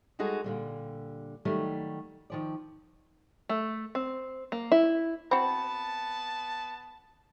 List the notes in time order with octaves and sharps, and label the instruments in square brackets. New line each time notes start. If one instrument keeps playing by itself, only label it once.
[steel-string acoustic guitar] G3 G#3 D#4 F#4 G#4 A4
A#2 D3 G3
D#3 F#3 G3 A3
D#3 F3 D5
[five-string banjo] A3
C4
A#3
E4
[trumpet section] B3 A5 [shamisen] C4 F#4 [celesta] B5